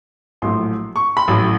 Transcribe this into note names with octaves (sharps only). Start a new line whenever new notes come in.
A#1 A2 F#3 C6
C#6
B5
A1 A2 F#3